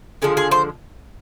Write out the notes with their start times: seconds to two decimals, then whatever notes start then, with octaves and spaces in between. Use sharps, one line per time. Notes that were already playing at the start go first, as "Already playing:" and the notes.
0.22 D3 F3 G#3 G#4
0.37 G#4
0.51 C5